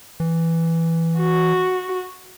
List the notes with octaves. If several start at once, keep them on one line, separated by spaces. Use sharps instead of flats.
E3
F#4